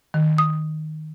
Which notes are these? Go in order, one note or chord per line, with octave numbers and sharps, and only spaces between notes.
D#3
D#6